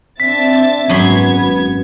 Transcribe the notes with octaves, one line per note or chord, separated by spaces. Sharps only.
C4 D4 E5 A6 B6
G#1 F#2 B3 B5 C6 G#6